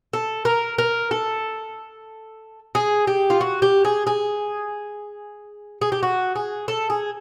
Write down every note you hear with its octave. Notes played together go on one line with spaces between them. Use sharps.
A4
A#4
A#4
A4
G#4
G4
F4
F#4
G4
G#4
G#4
G#4
G4
F#4
G#4
A4
G#4